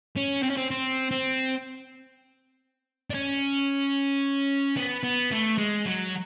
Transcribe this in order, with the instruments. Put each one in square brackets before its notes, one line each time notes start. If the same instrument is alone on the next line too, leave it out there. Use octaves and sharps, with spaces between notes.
[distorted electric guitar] C#4
C4
C#4
C4
C4
C4
D4
C#4
B3
B3
A3
G#3
F#3